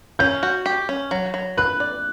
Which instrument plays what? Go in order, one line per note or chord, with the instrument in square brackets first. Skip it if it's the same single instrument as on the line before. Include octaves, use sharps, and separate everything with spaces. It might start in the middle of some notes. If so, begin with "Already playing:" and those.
[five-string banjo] C#4 [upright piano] G6
[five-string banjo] F#4
G4
C#4
F#3
F#3
[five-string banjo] B4 [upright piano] F#6
[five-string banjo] D5